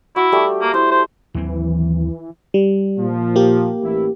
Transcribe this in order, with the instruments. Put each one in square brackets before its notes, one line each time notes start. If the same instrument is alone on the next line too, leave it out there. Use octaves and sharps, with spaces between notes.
[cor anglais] E4 [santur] F#4
[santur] G3 A3 G4
[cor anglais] A#3
[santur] E4 [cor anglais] C5
[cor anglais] C5
[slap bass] D#2 F#3 C4 [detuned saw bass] E3
[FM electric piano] G3
[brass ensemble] A#2 F3
[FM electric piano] A#3 G4
[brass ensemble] A1 E4